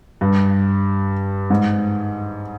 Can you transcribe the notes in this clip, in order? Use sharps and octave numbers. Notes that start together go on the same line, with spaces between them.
G2
G#2